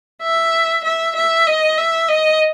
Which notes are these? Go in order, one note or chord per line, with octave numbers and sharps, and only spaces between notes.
E5
E5
E5
D#5
E5
D#5